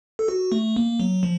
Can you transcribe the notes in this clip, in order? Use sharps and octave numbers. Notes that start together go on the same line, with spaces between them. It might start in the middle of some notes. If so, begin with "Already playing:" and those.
A4
F#4
A3
A#3
F#3
F3